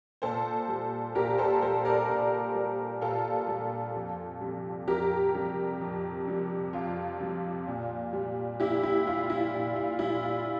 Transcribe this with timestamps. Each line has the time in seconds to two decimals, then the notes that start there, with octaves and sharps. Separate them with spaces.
0.22 A#2 A4 C5
0.68 G3
1.15 A#2 G4 A#4
1.38 A4 C5
1.61 G3 A4 C5
1.85 A#4 D5
2.09 A#2
2.55 G3
3.01 A#2 F4 A4
3.48 G3
3.95 F2
4.41 C3 G3
4.87 F2 G4 A#4
5.34 C3 G3
5.81 F2
6.27 C3 G3
6.73 F2 F4
7.20 C3 G3
7.67 A#2
8.13 G3
8.60 A#2 E4 G4
8.83 E4
9.06 G3 F4
9.30 E4
9.53 A#2
9.76 F4
9.99 G3 E4
10.23 F4